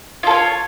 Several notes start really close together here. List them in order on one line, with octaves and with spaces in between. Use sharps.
F4 A4 C#5